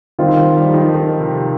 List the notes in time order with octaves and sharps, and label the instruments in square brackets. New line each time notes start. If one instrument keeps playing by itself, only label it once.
[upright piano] D#3 C4 F4 [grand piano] G3
[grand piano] G3
F3
D#3
F3
D#3
C3